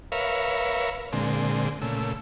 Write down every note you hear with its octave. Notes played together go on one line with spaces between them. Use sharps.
A#4 B4 C#5 E5 F5
A#2 D3 G#3 C4
A#2 C#3 A3 E6